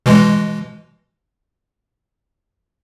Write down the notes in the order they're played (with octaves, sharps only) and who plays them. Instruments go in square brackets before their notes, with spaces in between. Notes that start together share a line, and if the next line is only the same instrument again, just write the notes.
[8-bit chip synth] B2 E3 G#3